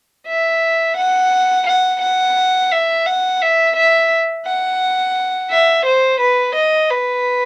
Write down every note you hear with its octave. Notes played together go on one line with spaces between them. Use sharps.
E5
F#5
F#5
F#5
E5
F#5
E5
E5
F#5
E5
C5
B4
D#5
B4